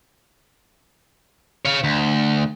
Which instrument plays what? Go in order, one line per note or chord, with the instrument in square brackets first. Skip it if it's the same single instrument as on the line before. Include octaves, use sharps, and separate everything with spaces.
[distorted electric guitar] C#5 F5
D2